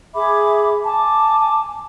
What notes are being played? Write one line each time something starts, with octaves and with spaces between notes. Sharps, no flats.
G#4 E5 B5 D6
G#5 A5 D6